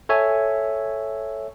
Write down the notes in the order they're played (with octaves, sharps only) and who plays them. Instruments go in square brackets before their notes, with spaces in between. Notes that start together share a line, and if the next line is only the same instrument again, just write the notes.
[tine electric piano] A4 C#5 E5 G#5